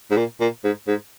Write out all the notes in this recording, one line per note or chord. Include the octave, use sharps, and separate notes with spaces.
G#2
A#2
A#2
G#2
G#2